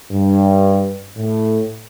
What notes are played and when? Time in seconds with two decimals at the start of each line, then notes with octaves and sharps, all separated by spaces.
0.12 G2
1.17 A2